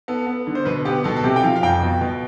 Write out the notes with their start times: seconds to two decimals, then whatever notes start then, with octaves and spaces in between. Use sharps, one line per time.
0.08 B3 A4
0.27 B3
0.47 D3
0.55 C5
0.65 B2 B4
0.85 B3 G4
1.04 B2 A4
1.17 A4
1.24 C3 G4
1.36 G5
1.43 F3 F5
1.56 F5
1.62 F2 G5
1.82 B2
2.01 B2